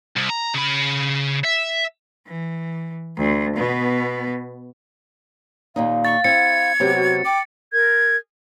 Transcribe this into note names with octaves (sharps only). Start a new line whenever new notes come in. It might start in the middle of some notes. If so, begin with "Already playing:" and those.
C2
A#5
C#3 B5
E5
E3
D2
B2 B3
D#2 A#2 D#4 F5
C#6 A6
C4 E4 G#6 C#7
C3 F#3 B3 G4
F#4
G5 D6
A#4 G#6